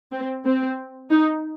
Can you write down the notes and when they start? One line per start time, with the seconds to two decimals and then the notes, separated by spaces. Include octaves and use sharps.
0.11 C4
0.45 C4
1.11 D#4